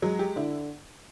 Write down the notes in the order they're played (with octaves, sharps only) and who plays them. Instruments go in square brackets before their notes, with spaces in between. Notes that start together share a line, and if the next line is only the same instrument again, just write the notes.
[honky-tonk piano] F#3 [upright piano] G#3
[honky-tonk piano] G4
[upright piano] D3 [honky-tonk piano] E4